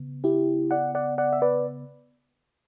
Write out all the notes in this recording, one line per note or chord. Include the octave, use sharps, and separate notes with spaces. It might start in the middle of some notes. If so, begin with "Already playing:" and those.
Already playing: C#3 B3
E4 G4
D5 F#5
D5 F#5
D5 F#5
E5
B4 D5